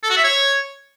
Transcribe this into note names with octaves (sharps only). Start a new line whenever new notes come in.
A4
F#4
E5
C#5